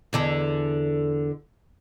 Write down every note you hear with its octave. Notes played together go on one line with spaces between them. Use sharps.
E2 D3 A4